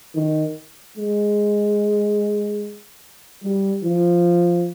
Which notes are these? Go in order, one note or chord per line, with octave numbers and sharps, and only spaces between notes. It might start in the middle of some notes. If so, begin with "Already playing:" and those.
D#3
G#3
G3
F3